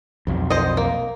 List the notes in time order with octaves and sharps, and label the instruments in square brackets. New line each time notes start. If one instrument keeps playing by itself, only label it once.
[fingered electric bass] B1 F2
[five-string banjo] C5 D#5
A#3